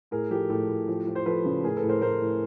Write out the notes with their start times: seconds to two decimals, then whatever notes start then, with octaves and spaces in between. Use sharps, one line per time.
0.11 A2 G#4 A#4
0.30 F3 G4 A4
0.50 A2 G4 A4
0.68 A2
0.88 F3
1.07 F3
1.15 C5
1.26 F3 A4 B4
1.45 C#3
1.64 A2 G#4 A#4
1.77 A4 B4
1.83 A2
1.89 A#4 C5
2.01 A2 A#4 C5
2.21 A2